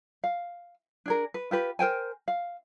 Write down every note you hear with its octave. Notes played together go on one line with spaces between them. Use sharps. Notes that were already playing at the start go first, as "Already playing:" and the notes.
F5
D4 G#4 A#4
B4
F4 G4 B4
A#4 C5 G5 G#5
F5